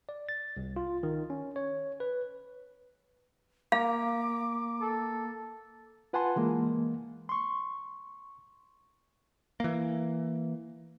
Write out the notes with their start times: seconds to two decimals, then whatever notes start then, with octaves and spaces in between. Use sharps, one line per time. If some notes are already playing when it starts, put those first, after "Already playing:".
0.09 D5
0.29 A6
0.57 C2
0.76 F4
1.03 D#3
1.30 C#4
1.56 C#5
2.00 B4
3.72 A#3 F5 A#5 D6
4.82 A4
6.13 F4 B4 F#5 G#5 A5 C6
6.36 E3 G#3 A#3
7.29 C6 C#6
9.60 E3 A#3